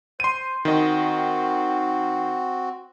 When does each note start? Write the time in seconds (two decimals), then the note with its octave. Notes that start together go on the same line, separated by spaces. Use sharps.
0.20 C5 C6 D#7
0.65 D#3 C4 F#4 D#5